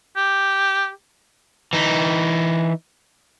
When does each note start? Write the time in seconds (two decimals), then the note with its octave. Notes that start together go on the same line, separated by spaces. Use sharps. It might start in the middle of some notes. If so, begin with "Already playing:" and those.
0.16 G4
1.73 E3 D#4